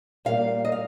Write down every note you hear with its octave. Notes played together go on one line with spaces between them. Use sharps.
A#2 G3 A#3 F5
D#5
F5